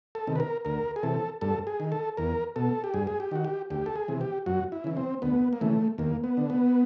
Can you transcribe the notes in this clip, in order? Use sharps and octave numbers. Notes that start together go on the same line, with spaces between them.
A4
C3 D#3
B4
A#4
D2 A#4
G#4
C3 E3 A4
G2 A4
G#4
D#3
A4
E2 A#4
B2 A4
G4
G2 G#4
G#4
G4
D#3 F#4
G4
D2 G4
A4
G#4
C3 E3
G4
F#2 F#4
E4
C#3 E3
C4
D2 B3
A#3
C#3 E3 A3
D#2 A#3
B3
D3
B3